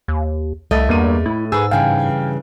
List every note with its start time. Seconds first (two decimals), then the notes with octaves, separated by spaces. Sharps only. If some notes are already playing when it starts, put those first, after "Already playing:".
0.08 D#2
0.71 C2 A3 D#5 E5 A5 A6
0.89 E2 G2 A#3 D#7
1.26 A2 E4
1.52 G#2 G#4 B4 E6
1.71 G2 C#3 E3 F5 G5 G#5